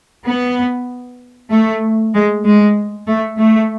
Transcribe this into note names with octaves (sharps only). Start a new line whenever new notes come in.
B3
A3
G#3
G#3
A3
A3